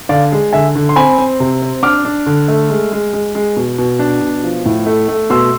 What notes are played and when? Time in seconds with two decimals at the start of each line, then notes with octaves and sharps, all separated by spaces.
0.09 D3 D5 F5
0.32 G#3
0.53 D3 E5 G#5
0.75 D3
0.89 C6
0.96 C4 G#5 B5
1.18 C4
1.40 C3
1.62 C4
1.83 D4 D6 F6
2.05 D4
2.26 D3
2.48 A3
2.70 G#3
2.92 G#3
3.13 G#3
3.35 G#3
3.57 B2
3.78 B2
3.99 D4
4.21 B2
4.44 F3
4.66 A2
4.86 A3
5.09 A3
5.30 B2 C6 E6